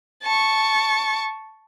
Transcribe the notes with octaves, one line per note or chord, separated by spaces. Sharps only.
A5 C#6